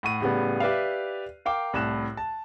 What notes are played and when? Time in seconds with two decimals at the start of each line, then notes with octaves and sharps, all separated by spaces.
0.03 A2 F#5 C#6 D#7
0.21 A2 C#3 G3 B3
0.60 G4 B4 D5 E5 F5
1.45 A#4 F5 G5 D6
1.73 C2 A2 F#6 E7
2.17 A5